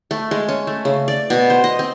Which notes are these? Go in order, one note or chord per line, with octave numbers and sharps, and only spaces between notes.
A3
G#3
C#4
A3
C#3
D5
B2
C5
D#5
C4